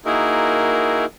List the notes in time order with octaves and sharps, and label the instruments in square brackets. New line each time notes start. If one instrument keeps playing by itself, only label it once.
[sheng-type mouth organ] A#3 D#4 E4 F#4 G#4 A#4